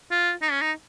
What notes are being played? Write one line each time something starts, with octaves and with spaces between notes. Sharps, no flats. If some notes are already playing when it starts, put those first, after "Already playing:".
F4
D#4
C#4
D#4